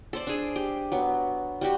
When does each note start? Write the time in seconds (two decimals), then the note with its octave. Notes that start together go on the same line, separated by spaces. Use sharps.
0.13 A4 C5 D5
0.27 D4 G#4
0.56 G4
0.92 F#3 B3
1.61 G3 F#4 G4